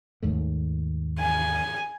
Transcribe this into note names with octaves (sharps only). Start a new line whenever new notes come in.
D#2 G#2 A3
G#5